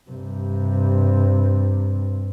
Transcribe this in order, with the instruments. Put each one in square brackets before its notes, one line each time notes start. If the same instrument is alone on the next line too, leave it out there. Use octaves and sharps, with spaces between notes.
[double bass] G2 C3